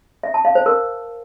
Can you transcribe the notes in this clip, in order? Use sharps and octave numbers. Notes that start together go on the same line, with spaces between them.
E5
A5
F5
C5
A#4